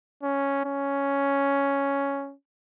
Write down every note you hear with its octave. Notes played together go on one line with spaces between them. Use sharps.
C#4
C#4